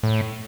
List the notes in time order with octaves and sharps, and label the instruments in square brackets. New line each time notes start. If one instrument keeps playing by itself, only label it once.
[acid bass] A2